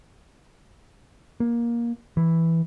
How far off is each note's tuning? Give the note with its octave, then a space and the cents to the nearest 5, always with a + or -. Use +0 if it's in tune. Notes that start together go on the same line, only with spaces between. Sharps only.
A#3 +15
E3 +0